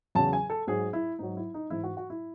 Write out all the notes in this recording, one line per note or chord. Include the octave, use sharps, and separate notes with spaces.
E2 C#3 F#3 A5
G#5
A4
G#2 F#3 G#4
E4
G#2 F#3 D#4
E4
D#4
G#2 E3 E4
F#4
F#4
E4